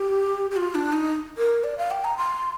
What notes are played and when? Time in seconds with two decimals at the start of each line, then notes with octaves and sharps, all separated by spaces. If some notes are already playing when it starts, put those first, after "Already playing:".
Already playing: G4
0.51 G4
0.57 F4
0.75 D4
0.93 D#4
1.38 A#4
1.64 D5
1.78 F5
1.91 G5
2.04 A#5
2.17 C6